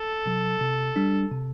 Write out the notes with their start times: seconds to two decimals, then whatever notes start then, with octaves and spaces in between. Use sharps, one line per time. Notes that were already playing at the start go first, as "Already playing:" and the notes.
Already playing: A4
0.26 C3 F#3
0.61 C3
0.96 G3 D4
1.31 C3